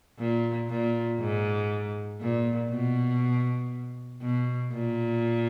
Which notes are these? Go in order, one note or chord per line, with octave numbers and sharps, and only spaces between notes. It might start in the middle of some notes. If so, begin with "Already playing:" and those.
A#2
A#2
G#2
A#2
B2
B2
A#2